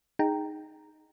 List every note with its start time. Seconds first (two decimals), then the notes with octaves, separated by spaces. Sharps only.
0.19 D#4 G#4 G5 A#5